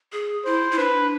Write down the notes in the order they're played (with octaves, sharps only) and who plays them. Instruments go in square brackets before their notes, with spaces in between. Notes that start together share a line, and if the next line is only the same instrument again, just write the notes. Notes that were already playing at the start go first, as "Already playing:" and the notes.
[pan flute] G#4
[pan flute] E4 [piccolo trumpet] C5
[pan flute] E4
[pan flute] D4 [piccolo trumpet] B4